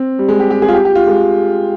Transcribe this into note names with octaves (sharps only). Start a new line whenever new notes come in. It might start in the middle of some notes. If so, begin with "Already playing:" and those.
Already playing: C4
G3
G#3
G4
G4
G#4
F4
G4
G4
F4
G#3